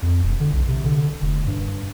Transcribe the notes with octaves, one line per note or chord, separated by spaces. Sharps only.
F2
E1
D3
B1
C3
D3
F1
G2